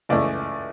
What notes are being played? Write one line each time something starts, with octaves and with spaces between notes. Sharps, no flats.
C#2 C#3 E3 A3 D5